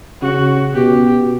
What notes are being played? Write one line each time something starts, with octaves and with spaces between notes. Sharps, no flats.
C#3 F#4
B2 G4